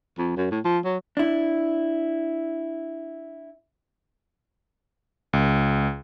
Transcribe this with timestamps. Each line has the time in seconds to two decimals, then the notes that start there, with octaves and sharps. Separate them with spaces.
0.18 F2
0.37 F#2
0.51 A2
0.65 F3
0.84 F#3
1.17 D4 E4
5.33 C#2